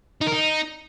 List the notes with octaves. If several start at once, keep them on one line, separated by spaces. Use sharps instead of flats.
D#4
A#4
D#4